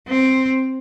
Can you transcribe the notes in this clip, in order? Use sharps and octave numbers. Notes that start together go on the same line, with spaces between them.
C4